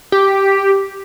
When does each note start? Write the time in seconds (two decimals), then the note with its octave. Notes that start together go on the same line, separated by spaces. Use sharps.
0.12 G4